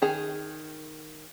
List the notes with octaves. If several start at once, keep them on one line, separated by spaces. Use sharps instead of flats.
D#3 G#4 A#5